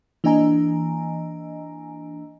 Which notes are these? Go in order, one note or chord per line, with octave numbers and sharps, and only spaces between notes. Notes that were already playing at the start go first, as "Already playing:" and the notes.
E3 A#3 D4 D#5 G#5 A#5